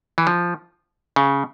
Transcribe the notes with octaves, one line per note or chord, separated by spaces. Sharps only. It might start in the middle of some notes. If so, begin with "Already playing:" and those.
E3
F3
C#3